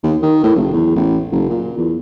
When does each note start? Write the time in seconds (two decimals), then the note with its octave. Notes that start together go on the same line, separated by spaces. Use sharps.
0.04 D#2
0.23 D#3
0.43 A2
0.56 F#1
0.73 E2
0.96 A1
1.32 F#1
1.50 A#2
1.77 E2